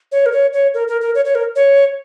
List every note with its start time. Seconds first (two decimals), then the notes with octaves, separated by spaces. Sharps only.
0.12 C#5
0.26 A#4
0.32 C#5
0.53 C#5
0.74 A#4
0.88 A#4
1.01 A#4
1.15 C#5
1.25 C#5
1.35 A#4
1.56 C#5